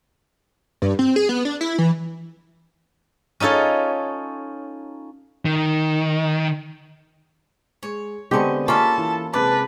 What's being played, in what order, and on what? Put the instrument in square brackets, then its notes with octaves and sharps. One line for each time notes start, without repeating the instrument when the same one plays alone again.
[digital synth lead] G2
C4
G#4
B3
D4
E4
E3
[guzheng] C#4 D#4 F4 A4 C#5
[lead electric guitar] D#3
[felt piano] G#3 [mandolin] C#5
[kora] D3 G#3 G4 [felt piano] B3 C4 [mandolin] D#5 C#6
[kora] A#3 C#4 F4 [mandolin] A4 B5 [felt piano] D#5 [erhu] A5
[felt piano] E3
[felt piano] C3 G#3 D6 [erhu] B4 [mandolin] A5